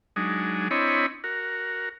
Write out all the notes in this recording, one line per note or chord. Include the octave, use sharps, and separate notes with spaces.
F#3 G#3 D4 D#4
C4 D4 E4 C#5 D#5 B5
F#4 A#4